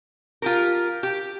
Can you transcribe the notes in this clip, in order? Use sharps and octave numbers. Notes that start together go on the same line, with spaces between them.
F4 G4 A#4
G4